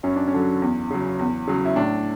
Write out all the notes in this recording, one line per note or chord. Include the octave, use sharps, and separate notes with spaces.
F#2 C#4
D4
C#4
D3 F#3
E2
C#3 F#3
E2
C#3 F#3
E4
A2 D4